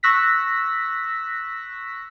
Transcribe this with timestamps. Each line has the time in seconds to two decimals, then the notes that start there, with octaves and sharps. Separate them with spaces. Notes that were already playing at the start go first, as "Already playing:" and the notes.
0.03 C#6 E6 F#6 A#6 B6